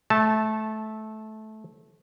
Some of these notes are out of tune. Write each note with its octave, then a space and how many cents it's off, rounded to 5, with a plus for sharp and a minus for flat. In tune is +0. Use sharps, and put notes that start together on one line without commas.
A3 -15 A5 +0